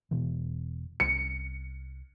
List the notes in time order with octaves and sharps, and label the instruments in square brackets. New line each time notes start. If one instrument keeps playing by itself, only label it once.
[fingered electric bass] E1 B2 E3
[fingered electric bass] C2 C#4 [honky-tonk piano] C#7